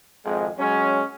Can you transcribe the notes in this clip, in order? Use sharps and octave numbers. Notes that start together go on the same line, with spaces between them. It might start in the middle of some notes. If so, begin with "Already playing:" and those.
G#1 F2 G#3
F#3 G#3 C#4